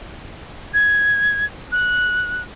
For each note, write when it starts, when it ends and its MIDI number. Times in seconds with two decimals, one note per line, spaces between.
0.74 1.45 92
1.72 2.42 90